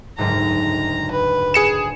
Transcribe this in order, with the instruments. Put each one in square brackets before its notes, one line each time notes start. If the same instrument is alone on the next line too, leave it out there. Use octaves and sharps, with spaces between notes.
[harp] F#1 D2 G#2 [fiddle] A#5
[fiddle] B4
[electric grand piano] G#4 C#7 E7